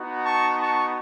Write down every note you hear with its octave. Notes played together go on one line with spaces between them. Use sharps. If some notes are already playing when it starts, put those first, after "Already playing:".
Already playing: B3 D#4 F#4
A5 C#6
A5 C#6